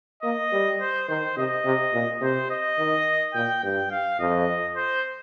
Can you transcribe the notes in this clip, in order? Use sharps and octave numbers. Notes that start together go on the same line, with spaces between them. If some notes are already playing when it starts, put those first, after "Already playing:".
A#3 D#5
G3
C5
D#3 C5
C3 D#5
C3
A#2
C3 C5
D#5
D#3
A#2 G5
G2 G5
F5
F2 D#5
C5